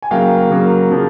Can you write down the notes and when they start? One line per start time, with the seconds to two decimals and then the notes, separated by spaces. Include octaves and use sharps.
0.02 G#5
0.11 C#3 F#3 A#3 F5 G5
0.50 C#3 F#3 A#3
0.91 C#3 F3